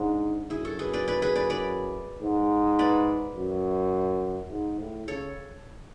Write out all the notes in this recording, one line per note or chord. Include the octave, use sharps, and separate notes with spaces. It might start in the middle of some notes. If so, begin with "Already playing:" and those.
Already playing: G#2 D4
F#2 E4 G#4
F#4 A4
G#4 B4
B4 D5
B4 D5
G#4 B4
B4 D5
B4 D5
G#2
B4 D5
F#2
G#2
A2
C#3 A4 C#5